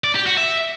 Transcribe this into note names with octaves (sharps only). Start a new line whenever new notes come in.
D5
G4
F#4
E5